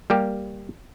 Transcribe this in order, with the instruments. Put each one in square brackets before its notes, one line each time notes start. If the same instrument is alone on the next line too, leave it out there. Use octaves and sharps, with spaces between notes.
[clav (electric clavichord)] G3 A#3 G4